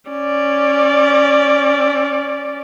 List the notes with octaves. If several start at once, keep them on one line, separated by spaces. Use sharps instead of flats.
C#4 D5